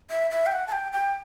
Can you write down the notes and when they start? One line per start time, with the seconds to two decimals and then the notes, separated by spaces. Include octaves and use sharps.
0.10 E5
0.31 E5
0.46 G5
0.52 F#5
0.67 A5
0.72 G5
0.93 G5